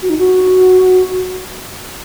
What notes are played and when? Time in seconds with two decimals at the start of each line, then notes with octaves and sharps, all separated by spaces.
0.02 F#4
0.10 D#4
0.18 F#4